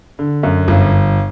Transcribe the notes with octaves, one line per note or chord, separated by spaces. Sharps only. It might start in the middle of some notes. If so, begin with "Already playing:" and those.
D3
F#2
G1